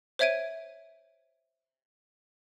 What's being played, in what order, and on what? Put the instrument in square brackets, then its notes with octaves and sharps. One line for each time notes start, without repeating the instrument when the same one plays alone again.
[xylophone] C5 C#5 E5 G#6 D7 D#7